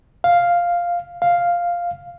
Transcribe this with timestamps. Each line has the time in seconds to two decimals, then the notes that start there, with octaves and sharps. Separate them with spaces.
0.24 F5
1.22 F5